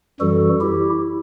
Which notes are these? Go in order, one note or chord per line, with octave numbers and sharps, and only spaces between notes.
F#2 E3 G3 F#4 A4
E4 G4